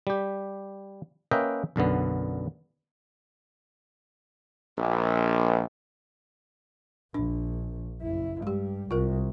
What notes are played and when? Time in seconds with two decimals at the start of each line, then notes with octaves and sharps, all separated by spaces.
0.07 G3 G4
1.31 A#3 C#4 B4 D#5 E5 G5
1.76 B1 F#2 D3 B3
4.78 A#1
7.14 A#1 D4
8.02 F#1 E4
8.42 G2 G3 G#3 G4
8.91 C2 C3 F4 A#4